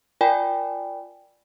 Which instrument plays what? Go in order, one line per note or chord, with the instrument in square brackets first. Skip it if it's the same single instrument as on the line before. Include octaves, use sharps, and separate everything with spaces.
[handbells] F4 A#4 D5 G5 G#5 B5